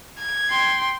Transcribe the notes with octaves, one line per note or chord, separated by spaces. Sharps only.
G#6
G5 C6